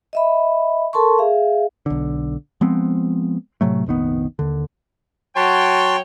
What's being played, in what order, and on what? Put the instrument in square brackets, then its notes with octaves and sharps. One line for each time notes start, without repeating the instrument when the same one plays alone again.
[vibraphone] D#5 E5 B5
A4 A#4 A5 C6 C#6
G#4 E5 F5
[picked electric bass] B1 D3
F3 G#3 B3 C4
A2 C3 F#3 A3
F1 A#1 D#3 B3
D#2 D3
[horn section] F#3 C#5 G5 [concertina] F#4 A5 C6